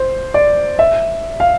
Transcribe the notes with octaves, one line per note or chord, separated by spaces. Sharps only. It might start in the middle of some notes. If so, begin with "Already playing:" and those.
Already playing: C5
D5
E5
F5